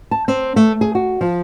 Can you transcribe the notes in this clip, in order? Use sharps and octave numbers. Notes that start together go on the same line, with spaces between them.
A5
C4
A3
G#4
F#4
F3